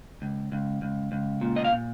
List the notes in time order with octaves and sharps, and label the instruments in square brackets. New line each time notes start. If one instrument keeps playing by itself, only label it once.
[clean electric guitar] C#2
C#2
C#2
C#2
A#2
D#5
F5
A#2